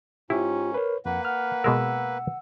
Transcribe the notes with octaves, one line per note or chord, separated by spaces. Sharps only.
G#2 C#4 E4 F4 G4
A#4 B4 C#5
F2 A#3 B4 F#5
F#5 F6
B2 G#3 A#4 E6